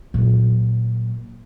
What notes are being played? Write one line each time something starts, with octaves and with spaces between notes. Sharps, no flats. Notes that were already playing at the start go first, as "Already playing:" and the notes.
A#2 F#3